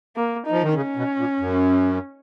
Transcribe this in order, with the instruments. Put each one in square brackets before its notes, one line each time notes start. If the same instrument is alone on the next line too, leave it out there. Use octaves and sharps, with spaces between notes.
[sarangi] A#3
D#4
[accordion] F3
D#3
[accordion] C#3 [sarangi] C#4
[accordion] B2
A#2
F#2